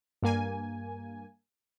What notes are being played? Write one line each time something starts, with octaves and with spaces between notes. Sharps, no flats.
G2 A#3 G#5